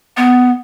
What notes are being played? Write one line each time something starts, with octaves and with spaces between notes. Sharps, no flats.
B3